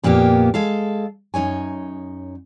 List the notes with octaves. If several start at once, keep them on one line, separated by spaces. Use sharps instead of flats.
F2 A#2 A#3 B3 G4
G#3 A4 F5
F#2 D#4 C#5 G#5